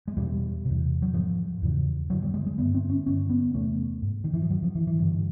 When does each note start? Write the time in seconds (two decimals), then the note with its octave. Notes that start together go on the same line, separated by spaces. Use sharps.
0.08 G#3
0.17 E2 B2 G3
0.65 E2 C3
1.02 F#3
1.13 G#2 F3
1.62 E2 C#3
2.10 G2 D3 F#3
2.22 G3
2.34 G#3
2.46 G#3
2.58 G2 D3 B3
2.74 C4
2.90 C#4
3.06 G2 D3 C#4
3.30 B3
3.54 E2 C3 A3
4.02 G#2
4.24 D#3
4.33 E3
4.42 F3
4.50 G#2 F#3
4.62 F3
4.75 E3
4.87 E3
4.99 G2 D3